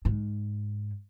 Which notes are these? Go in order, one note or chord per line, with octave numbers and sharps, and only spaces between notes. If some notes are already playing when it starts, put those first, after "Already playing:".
G#2